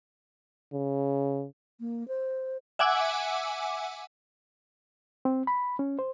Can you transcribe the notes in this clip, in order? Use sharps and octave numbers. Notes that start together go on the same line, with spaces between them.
C#3
A#3
C5
E5 F#5 G#5 D6 E6
C4
B5
C#4
C5